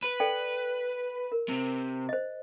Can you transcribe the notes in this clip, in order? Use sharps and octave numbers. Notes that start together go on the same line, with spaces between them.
B4
A4 D5 G5
A#4
C3
C5 D#5